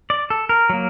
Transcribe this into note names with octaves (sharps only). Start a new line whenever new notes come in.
D5
A4
A#4
F#3 A#3